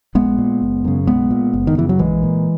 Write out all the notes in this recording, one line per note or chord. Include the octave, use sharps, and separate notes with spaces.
A#1 G#3 B3
A#2
F#1
F#2 C#3
B1 G#3 B3
A#2
F#1
D#3
F#2 C#3 E3
F#3
A#1 E3 G#3
A#2